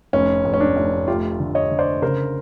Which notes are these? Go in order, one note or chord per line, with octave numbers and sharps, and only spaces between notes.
F1 C#4
F1
C#4
D4
F1
A3 F4 G4
D3
C#5 D#5
D3
C5 D5
C#3 A#4 C5